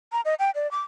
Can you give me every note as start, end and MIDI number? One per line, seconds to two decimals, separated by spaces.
0.12 0.21 82
0.25 0.34 75
0.39 0.51 79
0.55 0.70 74
0.71 0.81 86